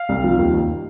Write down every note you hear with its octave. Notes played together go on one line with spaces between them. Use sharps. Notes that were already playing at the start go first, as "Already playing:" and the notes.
Already playing: F5
C2
F3
D#2
D#2